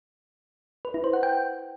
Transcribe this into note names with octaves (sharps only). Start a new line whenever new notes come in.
B4
E4
C5
F#5
G5